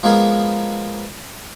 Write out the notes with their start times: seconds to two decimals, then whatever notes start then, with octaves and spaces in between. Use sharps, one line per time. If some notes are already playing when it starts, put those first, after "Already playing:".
0.03 F3 G#3 A#3 B3 G#4 A#4